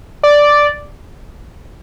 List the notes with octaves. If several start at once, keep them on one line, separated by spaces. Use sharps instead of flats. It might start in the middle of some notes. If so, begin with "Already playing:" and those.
D5